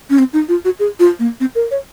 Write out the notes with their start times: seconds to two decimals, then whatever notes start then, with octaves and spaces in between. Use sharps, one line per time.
0.10 C#4
0.19 C4
0.33 D#4
0.49 F4
0.65 F#4
0.80 G#4
1.00 F4
1.19 A#3
1.40 C4
1.55 A#4
1.71 C#5